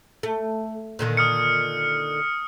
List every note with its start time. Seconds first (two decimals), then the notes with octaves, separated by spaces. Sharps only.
0.23 A3
0.99 A#2 D3 D#3
1.17 D#6 F6 C#7